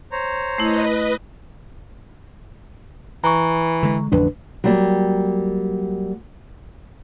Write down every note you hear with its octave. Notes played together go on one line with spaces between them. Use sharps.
C5 C#5 A#5
A3 E4 B4 D#5
E3 A#5 C#6
D3 G#3
A1 F2 D3 D4 B4
F#3 G3 A#3